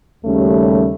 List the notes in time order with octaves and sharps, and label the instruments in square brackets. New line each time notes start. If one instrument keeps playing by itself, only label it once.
[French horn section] D#2 C#3 G3 A3 C#4